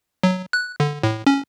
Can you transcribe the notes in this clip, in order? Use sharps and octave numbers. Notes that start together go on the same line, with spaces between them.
F#3
F#6
D3
A2
C#4